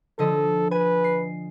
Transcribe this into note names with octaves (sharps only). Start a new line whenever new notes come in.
D3 F3 A4 D#5
B4 G#5
C7